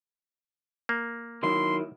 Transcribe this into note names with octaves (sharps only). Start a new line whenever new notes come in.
A#3
D#3 F#3 E4 C6